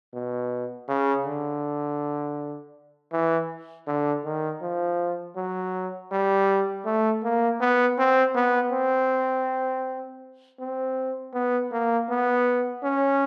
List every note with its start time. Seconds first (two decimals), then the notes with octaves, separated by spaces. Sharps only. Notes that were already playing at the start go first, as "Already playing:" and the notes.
0.13 B2
0.88 C#3
1.25 D3
3.12 E3
3.87 D3
4.25 D#3
4.61 F3
5.36 F#3
6.11 G3
6.85 A3
7.24 A#3
7.61 B3
7.98 C4
8.35 B3
8.72 C4
10.60 C4
11.34 B3
11.72 A#3
12.09 B3
12.83 C#4